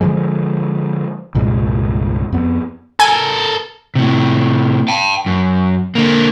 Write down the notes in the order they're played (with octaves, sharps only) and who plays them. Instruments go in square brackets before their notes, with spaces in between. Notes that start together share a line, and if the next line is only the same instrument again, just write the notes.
[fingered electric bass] D3 E3 F3 G#3
G1 C2 A#2 G#3
F2 B3
[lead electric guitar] A4 A#4 [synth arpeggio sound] G#5
[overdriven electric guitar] A2 C3
G5 A5
F#2
D3 A#3